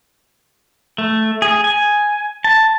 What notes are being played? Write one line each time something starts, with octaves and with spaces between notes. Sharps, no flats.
A3
G#4
G#5
A5